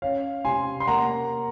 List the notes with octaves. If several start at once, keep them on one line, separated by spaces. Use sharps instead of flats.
C#4 C#5 F5
C3 G#5 C6
C6
A#3 F#5 A#5